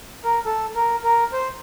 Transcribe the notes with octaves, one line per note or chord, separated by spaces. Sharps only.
A#4
A4
A#4
A#4
C5